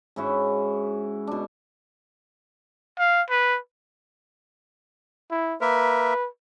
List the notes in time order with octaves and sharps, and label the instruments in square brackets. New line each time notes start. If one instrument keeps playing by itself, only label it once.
[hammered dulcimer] G#2 C#4 E4 F#4
B2 D4
[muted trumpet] F5
B4
[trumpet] E4
[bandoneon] A#3 A#4 E5 [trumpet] B4